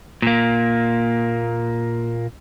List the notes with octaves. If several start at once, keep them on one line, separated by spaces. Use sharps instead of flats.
A#2 A#3